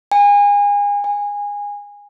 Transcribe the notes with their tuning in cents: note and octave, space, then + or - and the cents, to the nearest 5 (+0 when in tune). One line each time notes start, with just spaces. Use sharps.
G#5 -30
G#5 -20